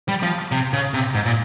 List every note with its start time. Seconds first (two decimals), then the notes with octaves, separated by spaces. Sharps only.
0.09 G3
0.23 F3
0.52 C3
0.73 C#3
0.94 C3
1.15 G#2
1.26 A#2